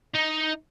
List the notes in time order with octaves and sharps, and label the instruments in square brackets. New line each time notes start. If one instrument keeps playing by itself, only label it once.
[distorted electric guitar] D#4